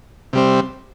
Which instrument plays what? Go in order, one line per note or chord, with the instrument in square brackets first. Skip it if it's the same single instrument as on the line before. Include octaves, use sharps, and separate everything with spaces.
[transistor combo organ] C3 G3 C4